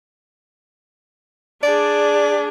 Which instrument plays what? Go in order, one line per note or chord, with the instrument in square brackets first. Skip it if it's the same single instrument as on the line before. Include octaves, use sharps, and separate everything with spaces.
[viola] D4 G#4 [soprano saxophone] D5